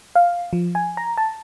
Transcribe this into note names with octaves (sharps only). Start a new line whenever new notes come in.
F5
F3
G#5
A#5
A5